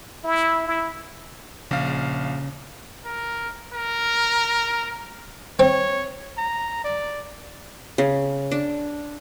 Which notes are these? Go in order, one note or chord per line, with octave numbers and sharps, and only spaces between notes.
E4
E4
A#1 C#3 F5
A#4
A#4
C4 C#5
A#5
D5
C#3
D4